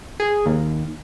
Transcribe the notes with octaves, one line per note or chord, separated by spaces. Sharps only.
G#4
D#2